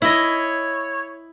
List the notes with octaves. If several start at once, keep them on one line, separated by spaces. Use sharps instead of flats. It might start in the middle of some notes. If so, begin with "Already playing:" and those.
E4 C#5 D#5